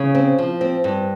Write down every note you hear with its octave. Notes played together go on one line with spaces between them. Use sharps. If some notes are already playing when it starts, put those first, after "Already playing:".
Already playing: C#3
C4
F3
C4
G2